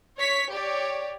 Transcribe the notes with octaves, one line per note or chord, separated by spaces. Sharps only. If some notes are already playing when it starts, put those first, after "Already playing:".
C#5 C#6 B6
G4 C#5 D5